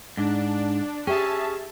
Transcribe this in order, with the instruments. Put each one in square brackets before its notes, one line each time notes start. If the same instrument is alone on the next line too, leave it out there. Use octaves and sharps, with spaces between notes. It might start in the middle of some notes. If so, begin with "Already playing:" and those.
[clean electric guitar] G#2 [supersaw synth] D4
[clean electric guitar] C#4 [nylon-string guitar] G4 [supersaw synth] G#4 E5 A5